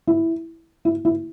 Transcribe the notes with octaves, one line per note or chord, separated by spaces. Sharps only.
E4
E4
E4